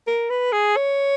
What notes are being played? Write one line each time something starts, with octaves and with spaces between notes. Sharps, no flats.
A#4
B4
G#4
C#5